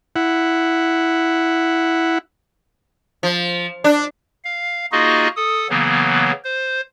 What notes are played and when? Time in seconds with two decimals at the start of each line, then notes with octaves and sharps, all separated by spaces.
0.16 E4 F#5
3.23 F3
3.84 D4
4.45 F5
4.92 A#3 D#4 F4 F#4 G#4 D#5
5.36 A4 D#6
5.70 C#3 E3 F#3 A#3 B3
6.45 C5